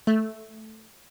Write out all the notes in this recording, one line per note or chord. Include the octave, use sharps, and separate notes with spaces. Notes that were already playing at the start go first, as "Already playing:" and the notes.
A3